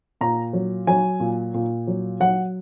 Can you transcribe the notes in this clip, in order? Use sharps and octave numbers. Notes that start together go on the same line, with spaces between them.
A#2 A#5
F#3
F#3 G#5
A#2
A#2
F#3
F#3 F#5